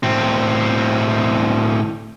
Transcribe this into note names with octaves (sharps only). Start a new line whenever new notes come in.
A2 C4